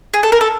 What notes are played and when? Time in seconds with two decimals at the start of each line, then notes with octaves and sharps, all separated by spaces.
0.14 G#4
0.23 A4
0.32 A#4
0.41 A4